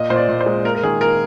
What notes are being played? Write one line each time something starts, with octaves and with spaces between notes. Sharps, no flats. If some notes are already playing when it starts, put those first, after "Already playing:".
Already playing: A#2 D#5
A#2 C5
D5
A#2
C5
G#3
A#3 A#4
A#4
D#3 G#4
A#3 A#4